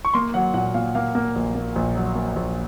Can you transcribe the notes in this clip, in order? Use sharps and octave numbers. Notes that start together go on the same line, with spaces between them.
C#6
A#3 C6
F#3 F#5
A#2 F#5
A#2 F5
A#3 F5
A#3
A#1
A#3
A#1
F#3
A#3
A#1